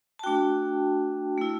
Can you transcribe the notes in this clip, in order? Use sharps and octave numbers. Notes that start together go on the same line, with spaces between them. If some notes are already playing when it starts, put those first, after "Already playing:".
A5
A3 D4 F#4 G5
A3 E4